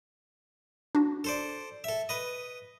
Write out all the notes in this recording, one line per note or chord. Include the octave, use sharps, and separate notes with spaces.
D4 F#4
A4 C5 D5
A4 E5
B4 D#5